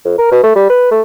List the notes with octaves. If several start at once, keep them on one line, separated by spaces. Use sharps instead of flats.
F2
A#4
B2
A3
G3
B4
A3